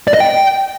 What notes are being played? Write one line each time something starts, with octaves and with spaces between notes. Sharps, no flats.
D5
D#5
G5